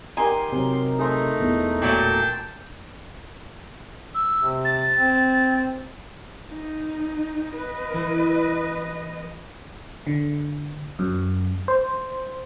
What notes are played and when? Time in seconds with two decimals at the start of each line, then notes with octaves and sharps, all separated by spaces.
0.17 D#4 G4 A#4 G#5 C6
0.52 C3 F#3
0.99 A3 D#4 G#4 C5 C6
1.40 E1 E2
1.82 A#2 F#3 A3 G5 A5
4.15 E6
4.38 C3
4.65 A6
4.97 C4
6.49 D#4
7.53 B4 D#5
7.93 E3 E4
10.07 D3
10.99 F#2
11.68 C5